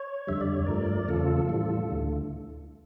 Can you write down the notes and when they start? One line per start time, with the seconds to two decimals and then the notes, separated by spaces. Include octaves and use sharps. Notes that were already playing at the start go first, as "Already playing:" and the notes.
Already playing: C#5
0.27 F2 D3 G3 E5
0.41 D5
0.53 C#5
0.66 G2 F3 A3 A#4 D5
1.09 E2 C#3 F3 A3 F4 A4
1.49 A2 E3 G3
1.89 D2 D3 A3